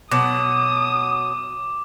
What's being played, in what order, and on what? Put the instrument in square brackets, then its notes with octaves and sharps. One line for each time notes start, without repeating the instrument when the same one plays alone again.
[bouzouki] B2 F#3 [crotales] D6 [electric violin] D#6